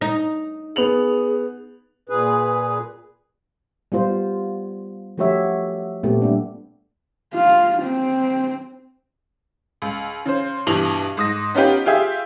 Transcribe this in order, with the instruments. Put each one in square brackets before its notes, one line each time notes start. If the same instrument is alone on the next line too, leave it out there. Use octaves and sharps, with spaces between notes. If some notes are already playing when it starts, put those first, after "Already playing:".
[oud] D#4
[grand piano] B3 F7 F#7 [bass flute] G#4
[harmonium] A#2 G#4 B4
[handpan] G3 B3 F4 C5
F3 A3 F#4 G4 C#5 E5
A#2 A3 B3 C4 G4
G3 D4
[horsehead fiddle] F4
C4
[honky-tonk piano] C#2
C#3 C5
G2 B2 E3 F7 F#7
G#2 D#6 A#6
B3 C#4 D#4 F4 G4 B4
F4 G4 G#4 E5